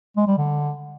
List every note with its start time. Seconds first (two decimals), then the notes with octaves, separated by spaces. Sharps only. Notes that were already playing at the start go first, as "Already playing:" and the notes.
0.17 G#3
0.27 G3
0.38 D3